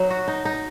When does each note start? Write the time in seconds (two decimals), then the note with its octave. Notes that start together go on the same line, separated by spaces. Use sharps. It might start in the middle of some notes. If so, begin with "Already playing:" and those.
Already playing: F#3 D#4
0.10 F#4
0.28 D#4
0.45 D#4